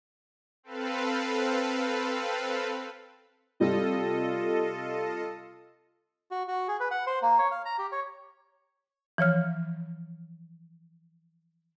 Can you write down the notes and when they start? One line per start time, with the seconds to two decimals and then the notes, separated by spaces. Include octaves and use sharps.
0.63 C4 A4 B4 F5
3.60 C3 G3 F4 A4 D#5
6.31 F#4
6.48 F#4
6.68 G#4
6.80 B4
6.91 F#5
7.07 C5
7.22 A#3
7.39 C#5
7.51 F5
7.65 A#5
7.78 G4
7.92 C#5
9.18 E3 F3 C#5 F6